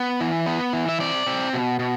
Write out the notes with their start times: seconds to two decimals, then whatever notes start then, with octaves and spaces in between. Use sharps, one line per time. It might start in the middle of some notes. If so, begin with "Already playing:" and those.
Already playing: B3
0.21 E3
0.46 B3
0.73 E3
0.89 E5
1.00 C4 D5
1.27 C4
1.53 B2
1.79 B2